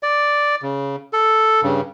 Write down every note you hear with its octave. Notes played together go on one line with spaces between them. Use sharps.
D5
C#3
A4
G2 C#3